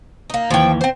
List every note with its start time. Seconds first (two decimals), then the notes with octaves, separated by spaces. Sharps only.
0.30 A#3 D#4
0.50 D#2 E3 F3 G5
0.81 C4 C5